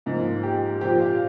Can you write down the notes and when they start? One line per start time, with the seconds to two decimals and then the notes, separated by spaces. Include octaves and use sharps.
0.06 G#2 F3 A#3 F4
0.43 G4
0.81 A#2 F3 C4 G4
1.00 F5